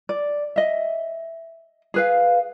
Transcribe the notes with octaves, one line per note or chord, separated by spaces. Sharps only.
D5
D#5 E5
G#4 B4 F5